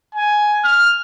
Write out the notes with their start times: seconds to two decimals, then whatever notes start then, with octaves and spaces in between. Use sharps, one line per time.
0.15 G#5
0.64 F6